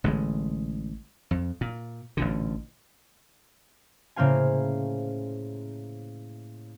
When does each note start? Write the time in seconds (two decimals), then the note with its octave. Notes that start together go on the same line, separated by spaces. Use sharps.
0.04 A1 D3 F#3 G#3
1.31 F2
1.61 A#2
2.17 A1 A#2 D3
4.16 A2 C#3 A#3 C5 F5 G#5